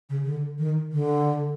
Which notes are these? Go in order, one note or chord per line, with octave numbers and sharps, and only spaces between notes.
C#3
D3
D#3
D3